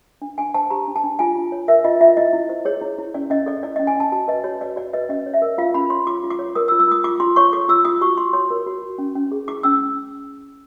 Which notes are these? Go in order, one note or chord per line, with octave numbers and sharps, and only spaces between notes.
D4
D4 G#5
C5 A5
G4 A#5
D4
A5
D4
F4 G#5
F4
C#5
A#4 E5
F4 D#5
F4 E5
E4 D#5
E4
C5
G#4 C#5
E4
E4
C#4 D5
C#4 D#5
A4 D5
E4 D5
C#4 D#5
G#5
C#4 A5
F#4 A5
B4 D#5
F#4 C#5
B4 D5
F#4 D5
B4 D#5
C#4 D#5
C#5
E5
A#4
F4 F5
C#4 B5
C#5 C6
F4 D6
F4
D6
C#5
A#4 D#6
E6
F4
E6
F4 D#6
F4 D6
F4 C6
C#5 C#6
A4 D6
F4 E6
F4 D#6
F#4 C#6
F#4 C6
C#5 C6
A#4
F#4
F#4
C#4
C#4
G#4
E4 D6
C#4 E6